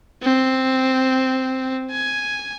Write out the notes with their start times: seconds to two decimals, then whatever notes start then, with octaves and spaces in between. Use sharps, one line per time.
0.22 C4
1.91 G#5